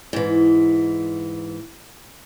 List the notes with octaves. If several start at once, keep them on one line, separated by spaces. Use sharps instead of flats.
G#2 E3